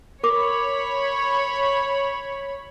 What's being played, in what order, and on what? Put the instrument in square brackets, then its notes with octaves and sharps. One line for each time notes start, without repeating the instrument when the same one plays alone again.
[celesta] A#4 D6 [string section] C#5 B5